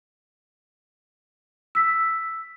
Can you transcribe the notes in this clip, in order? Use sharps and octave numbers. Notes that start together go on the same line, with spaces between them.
E6 B6